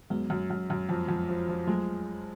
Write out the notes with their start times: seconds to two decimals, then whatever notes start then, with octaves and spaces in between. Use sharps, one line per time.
0.10 F#2 G#3 B3
0.30 F#2
0.50 F#2
0.70 F#2
0.89 F2
1.08 F2
1.29 F3
1.48 F3
1.67 F#3 G#3 A3